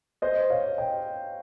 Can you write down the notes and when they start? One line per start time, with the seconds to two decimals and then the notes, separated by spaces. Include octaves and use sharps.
0.22 C5 D#5
0.50 C#5 F5
0.78 D#5 G5